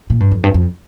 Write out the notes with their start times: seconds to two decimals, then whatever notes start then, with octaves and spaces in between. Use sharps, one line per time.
0.10 A#2
0.20 G2
0.31 F2
0.44 G2
0.54 F2